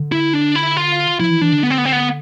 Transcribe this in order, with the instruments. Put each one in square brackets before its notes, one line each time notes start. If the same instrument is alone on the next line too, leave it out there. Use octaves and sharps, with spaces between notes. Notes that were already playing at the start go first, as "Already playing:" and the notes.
Already playing: [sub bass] D3
[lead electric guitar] E4
D4
E4
F4
[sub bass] F3 [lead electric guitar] E4
[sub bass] E3
[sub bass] E3 [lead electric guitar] D4
[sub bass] D3
[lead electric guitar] B3
C4
B3
C4
B3